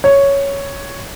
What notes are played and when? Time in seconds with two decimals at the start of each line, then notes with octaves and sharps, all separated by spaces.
0.04 C#5